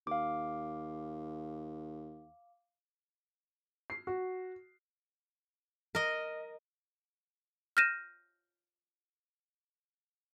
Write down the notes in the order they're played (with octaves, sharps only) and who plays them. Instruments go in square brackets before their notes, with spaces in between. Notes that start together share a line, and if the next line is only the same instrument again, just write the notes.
[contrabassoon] D#2 [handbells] F5 D6
[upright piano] C7
F#4
[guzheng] A#4 D#5
[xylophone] F6 G6 A#6 D#7 E7